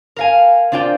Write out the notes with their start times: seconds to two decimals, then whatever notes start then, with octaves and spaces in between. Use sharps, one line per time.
0.16 A#4 F5 G#5
0.72 C4 D4 F4 D5 G5